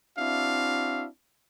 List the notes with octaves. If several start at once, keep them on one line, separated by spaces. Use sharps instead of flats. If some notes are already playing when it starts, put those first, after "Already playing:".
C4 D4 E4 F#4 E5 F5